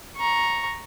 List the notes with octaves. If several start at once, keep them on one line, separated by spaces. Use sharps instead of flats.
A#5 C#6